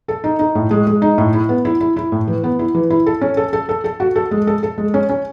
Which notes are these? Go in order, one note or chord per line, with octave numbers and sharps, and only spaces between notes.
A4
D#4
D#4
A2
G#3
G#3
D#4
A2
E4
B3
E4
E4
E4
A2
E3
B3
E4
E3
E4
A4
C#4
A4
A4
A4
A4
F#4
A4
G#3
A4
A4
G#3
C#4
C#4